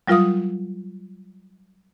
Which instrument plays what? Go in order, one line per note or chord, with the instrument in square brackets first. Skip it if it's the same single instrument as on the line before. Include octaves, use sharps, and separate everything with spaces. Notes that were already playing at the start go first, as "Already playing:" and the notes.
[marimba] F#3 G3 F4 A#4 F5 D#6